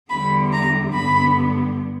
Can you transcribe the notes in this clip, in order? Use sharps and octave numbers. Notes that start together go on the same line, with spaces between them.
E2 D3 G3 B3 B5
A#5
G2 D3 G3 B3 B5